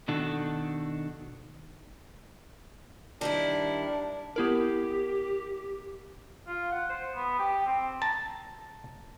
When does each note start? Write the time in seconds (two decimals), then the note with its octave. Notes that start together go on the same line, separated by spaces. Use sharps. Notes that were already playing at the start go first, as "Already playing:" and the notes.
0.08 B2 D#3 D4 F#4 A4
3.21 D#3 G3 D4 E4
4.36 B3 E4 G4 A#4
6.47 F4
6.72 F#5
6.90 C5
7.16 B3
7.39 G4
7.66 C4
8.02 A5 A#5